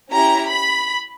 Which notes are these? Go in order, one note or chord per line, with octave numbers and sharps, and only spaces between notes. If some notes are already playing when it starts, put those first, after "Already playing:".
C#4 E4 G4 A#5
B5